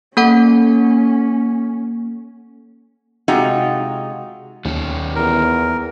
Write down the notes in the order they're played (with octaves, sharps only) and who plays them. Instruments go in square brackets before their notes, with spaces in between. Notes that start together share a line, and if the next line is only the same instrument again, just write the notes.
[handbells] A#3 A4 F#5 [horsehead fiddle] C#4
[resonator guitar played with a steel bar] C3 G#3 D#4 F4 F#4
[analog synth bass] D#2 [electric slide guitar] D#3 C#4
[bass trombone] E2 [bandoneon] A#4